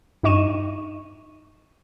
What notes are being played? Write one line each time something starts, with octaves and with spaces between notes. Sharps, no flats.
G2 D#4 D#5 C#6 D#7 E7